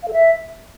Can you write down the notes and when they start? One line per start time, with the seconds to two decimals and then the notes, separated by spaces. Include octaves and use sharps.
0.03 F5
0.08 A4
0.13 E5